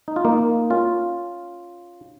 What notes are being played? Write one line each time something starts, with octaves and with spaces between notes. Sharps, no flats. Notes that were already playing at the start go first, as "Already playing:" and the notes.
D#4
F4
A#3 D#4
C#4 F4